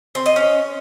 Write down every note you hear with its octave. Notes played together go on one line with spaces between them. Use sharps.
C4
D#5
C#4